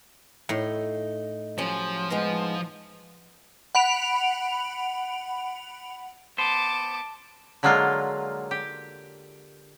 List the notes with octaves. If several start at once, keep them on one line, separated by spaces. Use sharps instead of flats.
A2 D#4
F3 F#3 C#4 G4
G#3 B3 D#4
F#5 B5 D7 F7
B3 C5 A5 D6
D3 F#3 G#3 A#3 F4
G4